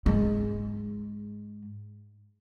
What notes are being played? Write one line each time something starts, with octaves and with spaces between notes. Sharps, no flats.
G#2 G#3